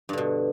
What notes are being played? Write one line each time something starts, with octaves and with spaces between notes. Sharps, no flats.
G2 B2 D3